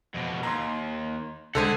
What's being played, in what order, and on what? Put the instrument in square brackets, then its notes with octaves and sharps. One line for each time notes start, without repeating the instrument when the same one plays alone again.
[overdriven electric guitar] F2 B2
[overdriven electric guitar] D#2 [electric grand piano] A#5 C6
[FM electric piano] C2 [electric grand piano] D3 G#3 [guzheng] A4 C5 G#5 [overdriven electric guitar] F#5